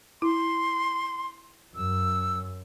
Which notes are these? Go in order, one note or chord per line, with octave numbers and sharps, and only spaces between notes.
E4 C6
F#2 E6